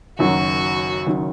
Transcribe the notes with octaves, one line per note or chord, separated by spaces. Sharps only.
F#1 F#2 D#3 F#3 F#4
F#1 D#3 F#3